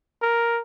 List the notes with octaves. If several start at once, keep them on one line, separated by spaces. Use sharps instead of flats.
A#4